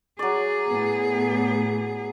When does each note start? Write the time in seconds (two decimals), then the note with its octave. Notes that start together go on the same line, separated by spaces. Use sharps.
0.19 F#3 G#4 D5
0.68 A2 B3